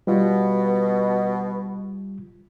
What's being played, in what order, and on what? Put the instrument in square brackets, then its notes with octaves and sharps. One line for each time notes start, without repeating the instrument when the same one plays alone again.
[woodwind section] B2 [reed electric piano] G3 F4